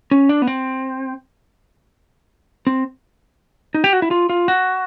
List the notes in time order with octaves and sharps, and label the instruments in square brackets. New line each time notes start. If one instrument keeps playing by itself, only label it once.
[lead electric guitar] C#4
D4
B3
C4
C4
D#4
G4
F#4
E4
F4
F4
F#4